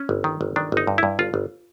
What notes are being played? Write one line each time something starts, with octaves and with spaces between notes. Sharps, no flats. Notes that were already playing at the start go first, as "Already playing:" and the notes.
Already playing: C#4
G1
D#3
G1
D#3 D4
G1 D#4
G2
G2 E4
G1 F4
G1